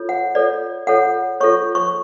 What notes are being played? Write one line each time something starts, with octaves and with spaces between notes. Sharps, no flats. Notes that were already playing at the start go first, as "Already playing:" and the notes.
Already playing: F4 A4 C#5
F#5
F4 A4 C#5 D5
F4 A4 C#5 F#5
F4 A4 C#5 C#6
C#6